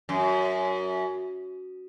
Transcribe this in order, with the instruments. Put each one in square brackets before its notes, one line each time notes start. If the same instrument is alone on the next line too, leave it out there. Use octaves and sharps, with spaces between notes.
[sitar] F#2